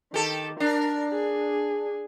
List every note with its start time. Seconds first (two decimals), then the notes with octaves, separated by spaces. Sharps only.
0.14 D#3 G4 A4
0.60 D4 A#4
1.14 G#4